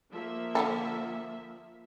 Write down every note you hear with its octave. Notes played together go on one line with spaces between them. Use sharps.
F3 A#3 E5
D3 E3 A4